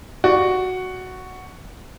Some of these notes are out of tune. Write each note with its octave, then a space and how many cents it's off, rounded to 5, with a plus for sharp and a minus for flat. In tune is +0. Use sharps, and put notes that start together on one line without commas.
F#4 +0 D5 +15